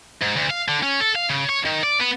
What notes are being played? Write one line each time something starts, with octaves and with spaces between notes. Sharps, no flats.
G#2
D2
F5
D3
C#4
A4
F5
C#3
C#5
D#3
D5
B3